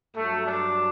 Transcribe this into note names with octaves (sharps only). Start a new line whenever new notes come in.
G2 F#3 A3
D4